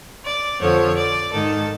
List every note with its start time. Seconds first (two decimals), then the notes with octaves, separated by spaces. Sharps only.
0.24 D5
0.60 F2 D3 F3 C#5
0.97 D5
1.32 G#2 D#3 A4